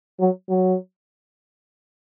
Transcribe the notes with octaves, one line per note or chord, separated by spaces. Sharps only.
F#3
F#3